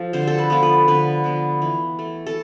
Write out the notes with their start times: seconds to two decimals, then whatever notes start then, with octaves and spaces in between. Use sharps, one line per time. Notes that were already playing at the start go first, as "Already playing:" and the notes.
Already playing: F3 A4
0.13 D3 C5
0.27 A4
0.38 B4
0.50 F3 B3
0.63 B4
0.88 D3 B4
1.24 F3 B3
1.62 E3
1.99 A3
2.27 A4